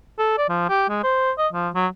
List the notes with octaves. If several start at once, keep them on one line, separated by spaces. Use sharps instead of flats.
A4
D5
F3
G4
G#3
C5
D#5
F3
F#3